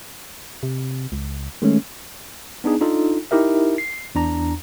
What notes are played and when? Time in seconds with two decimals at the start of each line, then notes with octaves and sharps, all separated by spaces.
0.63 C3
1.12 C#2
1.62 D#3 G#3 A3 C#4
2.64 B3 D4 D#4 G#4
2.81 D4 D#4 F4 A4
3.31 D#4 E4 G4 A#4 E5
3.78 C7
4.15 E2 D4 A#5